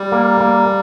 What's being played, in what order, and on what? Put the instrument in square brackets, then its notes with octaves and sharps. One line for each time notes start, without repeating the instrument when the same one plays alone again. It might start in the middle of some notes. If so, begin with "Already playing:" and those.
Already playing: [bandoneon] G3
[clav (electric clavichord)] A#3
A#3